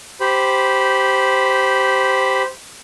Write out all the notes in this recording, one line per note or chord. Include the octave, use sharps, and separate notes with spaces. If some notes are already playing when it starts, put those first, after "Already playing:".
G4 C5 B5